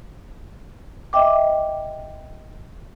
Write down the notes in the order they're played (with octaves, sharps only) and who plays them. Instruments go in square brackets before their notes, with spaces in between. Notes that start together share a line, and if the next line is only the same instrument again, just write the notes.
[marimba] D#5 E5 G5 D6